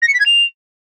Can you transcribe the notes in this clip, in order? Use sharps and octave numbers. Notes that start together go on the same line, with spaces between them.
A#6
C#7
B6
G#6
F7